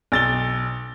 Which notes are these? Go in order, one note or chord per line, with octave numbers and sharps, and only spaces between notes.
B1 A6 G7